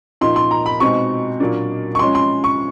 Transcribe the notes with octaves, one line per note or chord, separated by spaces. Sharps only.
A#2 F3 A#3 D#4 C6
C6
A#5
B5
B2 G#3 C4 D#4 C#6
A#2 F#3 A#3 D4
C#6
F3 G#3 C#4 C6
C6
C#6